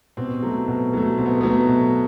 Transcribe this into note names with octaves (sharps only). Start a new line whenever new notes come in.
B2 C4
F#3 A3
B2
F#3 A3
B2 C4
B3
F#3 A3 B3
B2